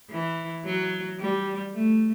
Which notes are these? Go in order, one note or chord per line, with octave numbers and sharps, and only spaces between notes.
E3
F#3
G3
A3